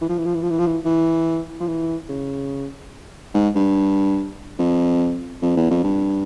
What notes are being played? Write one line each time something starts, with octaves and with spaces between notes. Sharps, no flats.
E3
F3
E3
F3
E3
F3
E3
F3
E3
E3
F3
E3
C#3
G#2
G2
F2
F2
E2
F2
G2